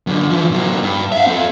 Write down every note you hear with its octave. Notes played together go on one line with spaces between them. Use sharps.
F#2 D3
E3 F3
C3 F#3
G2
E5 F5
C4 A4